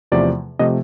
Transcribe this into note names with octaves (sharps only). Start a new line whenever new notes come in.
E2 C3 F3 A3 D5
C3 F3 A3 D#5